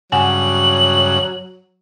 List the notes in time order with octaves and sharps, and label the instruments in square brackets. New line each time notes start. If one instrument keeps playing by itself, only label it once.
[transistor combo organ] G2 C#3 [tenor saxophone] F#3 [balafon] F#5 G#5 [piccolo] F#7